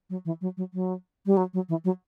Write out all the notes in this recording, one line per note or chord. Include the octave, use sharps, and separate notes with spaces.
F#3
E3
F#3
F#3
F#3
G3
F#3
F#3
E3
F#3